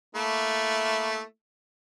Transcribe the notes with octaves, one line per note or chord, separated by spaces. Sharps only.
A3 A#3 E4